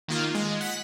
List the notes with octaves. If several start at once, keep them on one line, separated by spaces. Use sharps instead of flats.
D#3 A#3 F4
G#3
F#5 B6